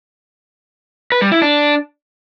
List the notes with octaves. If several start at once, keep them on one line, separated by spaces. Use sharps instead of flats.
B4
G3
E4
D4